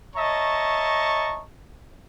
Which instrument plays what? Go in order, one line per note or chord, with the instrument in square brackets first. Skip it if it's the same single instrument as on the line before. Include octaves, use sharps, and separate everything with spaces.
[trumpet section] C#5 D#5 E5 A5 A#5 C#6